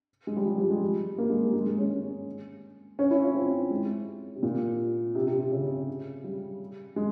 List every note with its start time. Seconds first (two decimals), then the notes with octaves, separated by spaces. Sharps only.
0.27 G#3
0.37 G3
0.45 F3
0.58 G3
0.70 G#3
1.18 A#3
1.30 G#3
1.41 G3
1.53 G#3
1.66 G#3
1.78 C#4
1.90 C#4
2.99 C#4
3.11 E4
3.23 F4
3.35 C4
3.71 G#3
4.35 C3
4.43 A#2
5.15 C3
5.27 C3
5.40 C3
5.51 C#3
6.24 G3
6.96 G#3